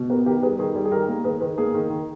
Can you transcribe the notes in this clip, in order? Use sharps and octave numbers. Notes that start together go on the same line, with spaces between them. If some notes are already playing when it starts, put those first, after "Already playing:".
Already playing: B2
B3 G4 A#4
D#3 G4 A#4
G3 G#4 B4
D#3 G#4
G3 G#4
G#4
D#3 G4 A#4
A#3
D#3 G#4 B4
D#3 G#4 B4
A#3 G#4
D#3
D#3